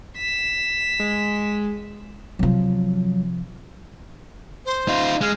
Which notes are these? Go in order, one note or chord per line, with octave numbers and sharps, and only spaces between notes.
B6 E7
G#3
C3 F3 F#3
C5
D#4 F4
G#3 F6